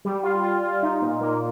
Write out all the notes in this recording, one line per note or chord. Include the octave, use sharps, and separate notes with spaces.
G3
F4
F4
F4
D#4
A#2
A#3